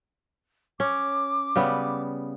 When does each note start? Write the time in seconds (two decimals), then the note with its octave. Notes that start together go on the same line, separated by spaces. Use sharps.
0.80 C#4 D6
1.56 C#3 G3 B3